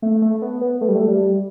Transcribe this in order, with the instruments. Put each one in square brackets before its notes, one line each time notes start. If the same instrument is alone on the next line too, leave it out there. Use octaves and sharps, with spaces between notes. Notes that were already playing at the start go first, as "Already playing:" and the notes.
[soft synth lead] A3
A3
B3
B3
A3
G3
A3
G3